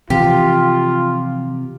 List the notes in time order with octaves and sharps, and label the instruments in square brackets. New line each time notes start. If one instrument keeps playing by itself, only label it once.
[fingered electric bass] C3 [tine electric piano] E3 F3 [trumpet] F4 [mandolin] G4